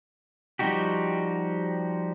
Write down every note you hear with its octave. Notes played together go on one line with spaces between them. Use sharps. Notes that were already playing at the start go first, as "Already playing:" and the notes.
F3 G3 D#4 F#4 G4